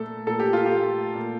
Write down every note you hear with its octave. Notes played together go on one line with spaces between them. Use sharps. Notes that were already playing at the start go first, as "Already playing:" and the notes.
Already playing: A#2 A3 A4
A#2 A4
G4
F4
G4
A3
A#2